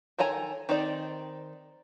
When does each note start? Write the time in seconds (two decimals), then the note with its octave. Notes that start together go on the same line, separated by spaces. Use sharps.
0.19 D#3 A4 C#5 G#5 A#5
0.69 D#3 C4 D#4 C5 D5